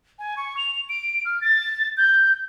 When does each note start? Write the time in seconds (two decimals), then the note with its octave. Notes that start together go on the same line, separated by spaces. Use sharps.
0.19 G#5
0.37 C#6
0.57 F7
0.89 D7
1.25 F6
1.41 A6
1.97 G6